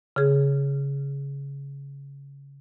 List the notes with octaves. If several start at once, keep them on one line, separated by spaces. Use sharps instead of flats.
C#3 G#4